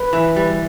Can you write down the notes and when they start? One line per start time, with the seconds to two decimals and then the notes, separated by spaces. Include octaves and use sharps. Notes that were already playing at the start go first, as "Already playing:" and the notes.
Already playing: B4
0.13 E3
0.36 G3